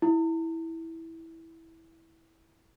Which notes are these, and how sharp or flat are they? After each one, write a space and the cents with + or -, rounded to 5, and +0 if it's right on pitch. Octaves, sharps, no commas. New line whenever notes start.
E4 -10